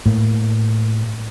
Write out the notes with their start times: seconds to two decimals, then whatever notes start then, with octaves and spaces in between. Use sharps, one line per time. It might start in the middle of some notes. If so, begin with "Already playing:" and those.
0.06 A2 A#3